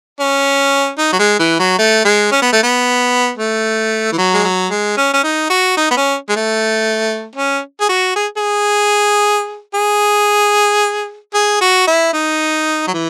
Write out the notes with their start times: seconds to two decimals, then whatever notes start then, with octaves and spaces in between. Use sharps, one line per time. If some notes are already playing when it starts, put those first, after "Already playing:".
0.20 C#4
0.98 D#4
1.12 F#3
1.19 G#3
1.39 E3
1.59 F#3
1.78 A3
2.05 G#3
2.31 C#4
2.42 B3
2.52 A3
2.63 B3
3.38 A3
4.12 E3
4.18 F#3
4.34 G#3
4.44 F#3
4.70 G#3
4.98 C#4
5.14 C#4
5.23 D#4
5.50 F#4
5.77 D#4
5.91 B3
5.97 C#4
6.29 G#3
6.36 A3
7.36 C#4
7.81 G#4
7.89 F#4
8.16 G#4
8.37 G#4
9.74 G#4
11.34 G#4
11.61 F#4
11.87 E4
12.13 D#4
12.88 F#3
12.94 E3